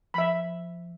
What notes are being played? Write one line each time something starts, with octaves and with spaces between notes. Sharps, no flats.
F3 E5 B5